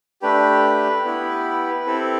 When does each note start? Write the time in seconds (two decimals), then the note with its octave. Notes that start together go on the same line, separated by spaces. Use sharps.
0.22 A3 D4 G4 B4
1.04 B3 E4 G4
1.86 C4 E4 G4 A4